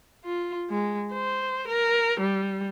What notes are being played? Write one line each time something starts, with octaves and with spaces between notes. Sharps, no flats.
F4
G#3
C5
A#4
G3